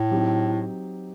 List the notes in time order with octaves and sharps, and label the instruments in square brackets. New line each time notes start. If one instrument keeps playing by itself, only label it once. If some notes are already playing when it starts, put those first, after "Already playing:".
Already playing: [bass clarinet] A2
[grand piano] F#3 C4 D#4 G4